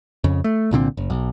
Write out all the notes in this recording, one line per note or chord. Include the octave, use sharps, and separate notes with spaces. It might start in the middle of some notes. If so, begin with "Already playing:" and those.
F2 C#3
A3
C2 A#2 D3 C4
F#1
B1